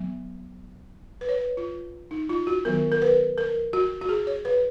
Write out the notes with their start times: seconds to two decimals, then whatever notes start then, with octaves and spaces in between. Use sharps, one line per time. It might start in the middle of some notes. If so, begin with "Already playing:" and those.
Already playing: F#3 B3
1.21 B4
1.29 C#5
1.38 B4
1.57 F4
2.11 D#4
2.29 F4
2.47 F#4
2.65 D#3 F#3 B3 A#4
2.92 A#4
3.02 B4
3.38 A#4
3.73 F#4
4.01 F#4
4.09 G#4
4.27 C#5
4.45 B4